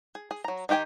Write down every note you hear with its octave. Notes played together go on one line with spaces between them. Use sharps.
G#4
G#4
F#3 A#5
D#3 D#4 G4 G5 G#5